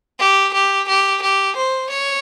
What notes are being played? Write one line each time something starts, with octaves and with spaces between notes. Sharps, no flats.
G4
G4
G4
G4
C5
C#5